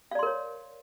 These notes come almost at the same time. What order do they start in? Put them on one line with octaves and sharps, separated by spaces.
F5 D5 C6 A#4 C#5